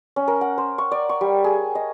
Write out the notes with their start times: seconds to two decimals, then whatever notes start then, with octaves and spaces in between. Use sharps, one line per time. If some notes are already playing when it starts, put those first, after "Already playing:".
0.16 C#4
0.28 A#4
0.41 F#5
0.58 C5
0.78 C#6
0.92 D5
1.09 C#6
1.21 G3
1.44 G#4
1.75 D#5